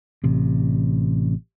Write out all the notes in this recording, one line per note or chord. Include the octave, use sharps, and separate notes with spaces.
A1 C3